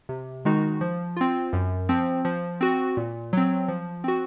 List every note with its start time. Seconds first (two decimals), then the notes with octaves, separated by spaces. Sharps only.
0.09 C3
0.45 D#3 G#3 D#4 F#4
0.81 F3
1.16 C4 F4
1.53 F#2
1.89 F3 C4
2.25 F3
2.61 C4 F#4
2.97 A#2
3.33 F#3 C4
3.68 F3
4.04 C4 F#4